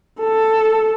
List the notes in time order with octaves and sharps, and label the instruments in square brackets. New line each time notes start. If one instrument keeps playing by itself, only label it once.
[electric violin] A4